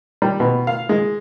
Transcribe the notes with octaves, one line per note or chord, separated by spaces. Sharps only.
G3
B2
F5
G#3